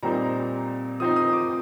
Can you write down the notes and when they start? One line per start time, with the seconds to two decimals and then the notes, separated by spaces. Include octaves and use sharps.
0.03 A#2 G3 C4 D#4 A#5
1.00 F3 C4 D#4 D#6
1.16 D#6
1.33 D6